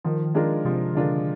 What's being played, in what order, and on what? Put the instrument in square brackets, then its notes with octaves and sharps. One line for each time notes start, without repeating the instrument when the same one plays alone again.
[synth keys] D#3 [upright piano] F3
[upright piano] G#3 D4 F4 A#4
[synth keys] C3 [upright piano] F3
[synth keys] D3 [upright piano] G#3 D4 F4 A#4